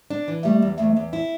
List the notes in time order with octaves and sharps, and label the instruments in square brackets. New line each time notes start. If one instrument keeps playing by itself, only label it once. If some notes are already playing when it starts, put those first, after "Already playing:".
[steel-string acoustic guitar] D4
E3
[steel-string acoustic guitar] G3 [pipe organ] A3
[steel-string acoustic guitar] E2
[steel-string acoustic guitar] E2 [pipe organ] A3
[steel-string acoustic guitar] E2
E4